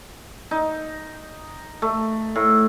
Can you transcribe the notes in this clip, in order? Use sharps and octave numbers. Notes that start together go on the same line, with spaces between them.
D#4
A3
A2